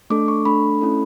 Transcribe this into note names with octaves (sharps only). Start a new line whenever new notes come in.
A3 D4 A4 D6
C#6
A3 D4 A4 B5
A3 C#4 E4 A4